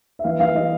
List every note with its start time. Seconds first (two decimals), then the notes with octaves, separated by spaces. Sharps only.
0.19 E5
0.24 E3 F5
0.40 E3 F5
0.55 E3 D#5